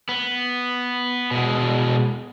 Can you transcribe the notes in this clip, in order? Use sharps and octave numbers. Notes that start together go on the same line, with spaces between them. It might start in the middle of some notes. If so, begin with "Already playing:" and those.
B3
B2 G#3